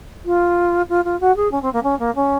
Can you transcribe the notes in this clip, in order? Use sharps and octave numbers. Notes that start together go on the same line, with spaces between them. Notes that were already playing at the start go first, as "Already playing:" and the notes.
F4
F4
F4
F#4
G#4
C#4
C4
A#3
C#4
A#3
C#4